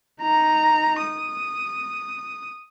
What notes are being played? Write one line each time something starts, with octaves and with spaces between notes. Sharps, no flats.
D#4 A#5
D#6